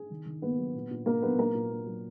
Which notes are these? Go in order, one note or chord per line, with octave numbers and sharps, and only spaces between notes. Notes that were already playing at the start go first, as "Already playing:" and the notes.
Already playing: G#4
D#3
D#3
A#3 B3 B4
F#3
A#2
A#2
A#3 A#4
F#3 B3 B4
A#2 A#3 A#4
A#2
A#3
F#3